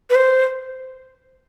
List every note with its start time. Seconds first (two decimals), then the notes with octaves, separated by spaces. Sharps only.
0.10 B4
0.15 C5